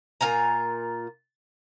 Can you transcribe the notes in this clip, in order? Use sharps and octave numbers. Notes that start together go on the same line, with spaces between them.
A#2 F4 G#5 A#5